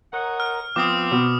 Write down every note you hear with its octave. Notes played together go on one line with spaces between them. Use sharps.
A#4 C#5 D#5 F#5
F6
F3 B3 C4 F4 D6 D#6
B2